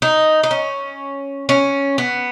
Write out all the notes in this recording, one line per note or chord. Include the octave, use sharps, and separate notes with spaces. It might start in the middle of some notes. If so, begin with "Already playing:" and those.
D#4
D#4
C#4
C#4
B3